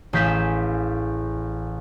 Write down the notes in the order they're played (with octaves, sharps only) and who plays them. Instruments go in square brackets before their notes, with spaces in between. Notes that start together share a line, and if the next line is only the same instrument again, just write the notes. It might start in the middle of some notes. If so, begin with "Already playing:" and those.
[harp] A1 G#4 F5 G6 B6 E7